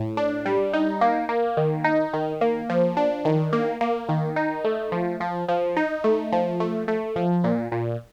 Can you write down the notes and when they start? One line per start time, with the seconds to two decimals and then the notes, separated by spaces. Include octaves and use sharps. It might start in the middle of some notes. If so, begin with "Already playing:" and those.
Already playing: A2
0.17 D4
0.46 G3
0.73 D#4
1.01 A#3
1.29 A#3
1.57 D#3
1.84 D#4
2.14 D#3
2.41 A#3
2.69 F3
2.97 D4
3.25 D#3
3.53 A#3
3.81 A#3
4.09 D#3
4.36 D#4
4.65 A3
4.92 F3
5.20 F3
5.48 F3
5.77 D#4
6.04 A3
6.33 F3
6.60 A3
6.88 A3
7.16 F3
7.44 A#2
7.72 A#2